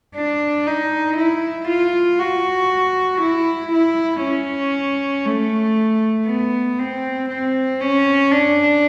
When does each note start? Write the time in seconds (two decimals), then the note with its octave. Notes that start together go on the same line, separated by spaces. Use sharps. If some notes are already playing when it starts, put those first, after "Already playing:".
0.15 D4
0.67 D#4
1.17 E4
1.69 F4
2.19 F#4
3.22 E4
3.73 E4
4.23 C#4
5.26 A3
6.28 B3
6.79 C4
7.29 C4
7.81 C#4
8.31 D4